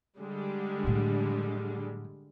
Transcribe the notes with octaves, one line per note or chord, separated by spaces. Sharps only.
D3 G3 G#3
A2 F#3